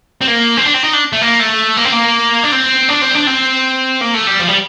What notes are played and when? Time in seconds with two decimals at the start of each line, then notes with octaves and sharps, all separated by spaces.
0.21 C4
0.28 A#3
0.57 C4
0.65 D4
0.74 C4
0.84 D#4
0.93 D4
1.13 A3
1.22 A#3
1.40 A3
1.77 A#3
1.85 C4
1.93 A#3
2.44 D4
2.52 C4
2.89 D4
3.02 C4
3.15 D4
3.27 C4
4.01 A#3
4.14 A3
4.27 G3
4.39 F3
4.48 G3